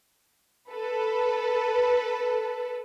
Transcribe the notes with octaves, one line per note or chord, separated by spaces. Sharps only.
A4 B4